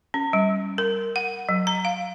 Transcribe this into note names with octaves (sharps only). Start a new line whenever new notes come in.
C#4
G3
A#4
F#5
F#3
A#5
F5